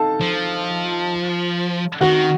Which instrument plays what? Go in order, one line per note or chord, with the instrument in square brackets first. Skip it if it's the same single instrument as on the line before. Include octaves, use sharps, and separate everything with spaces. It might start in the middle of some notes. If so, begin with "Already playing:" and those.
Already playing: [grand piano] D#4 A4 F5 A5
[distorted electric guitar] F3
[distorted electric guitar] D#3 [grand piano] F#4 F#5